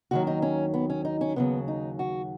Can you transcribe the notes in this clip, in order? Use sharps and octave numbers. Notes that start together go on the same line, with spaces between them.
D#2 D#3 F#3 F#4
D#4
C#4
B3
C#4
D#4
C#4
D#2 C#3 F#3 B3
D#4
F#4